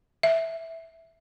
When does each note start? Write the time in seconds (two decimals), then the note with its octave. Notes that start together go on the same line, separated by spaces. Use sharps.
0.23 E5